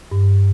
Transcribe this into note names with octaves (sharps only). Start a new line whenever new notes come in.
G2